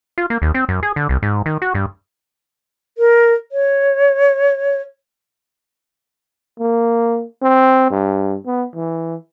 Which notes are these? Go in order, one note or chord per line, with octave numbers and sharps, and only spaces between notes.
F4
A#3
D#2
C4
F#2
G#4
D3
C2
G#2
D#3
F#4
G2
A#4
C#5
A#3
C4
G2
B3
E3